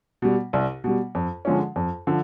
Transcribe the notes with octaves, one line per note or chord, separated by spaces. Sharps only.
B2 G3
C2
B2 G3
F2
D3 F3 G#3 C#4
F2
D3 F3